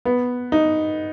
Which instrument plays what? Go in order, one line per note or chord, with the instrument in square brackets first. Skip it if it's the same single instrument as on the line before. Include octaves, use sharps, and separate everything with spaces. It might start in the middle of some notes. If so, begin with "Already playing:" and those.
[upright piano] B3
D#4